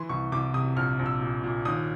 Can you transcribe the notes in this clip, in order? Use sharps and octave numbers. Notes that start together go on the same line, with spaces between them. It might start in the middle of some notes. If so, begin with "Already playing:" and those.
Already playing: E3 C6
C2 C#6
C2 D6
C3 D#6
A#1 F6
A#1
E6
A#2
A#2
D#2 D#6